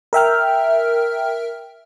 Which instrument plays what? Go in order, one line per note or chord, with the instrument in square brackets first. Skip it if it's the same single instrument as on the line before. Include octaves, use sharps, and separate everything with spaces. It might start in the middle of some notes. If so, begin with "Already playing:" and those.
[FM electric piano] A#4 E5 G5 F6